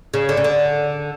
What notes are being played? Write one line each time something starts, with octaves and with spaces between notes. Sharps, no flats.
C#3
D3
C#3
D3